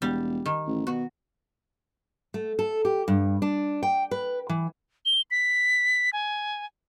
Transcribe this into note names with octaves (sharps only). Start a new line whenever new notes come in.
E1 G3
D#3
A1
B2 F#4
A3
A4
G4
G2
D4
G5
B4
E3
G7
B6
G#5